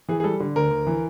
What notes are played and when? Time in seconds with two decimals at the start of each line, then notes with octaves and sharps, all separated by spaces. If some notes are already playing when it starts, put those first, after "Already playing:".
0.09 E3 G#4
0.20 G#4
0.24 G3 A4
0.40 D3
0.56 D2 A#4
0.71 D2
0.87 E3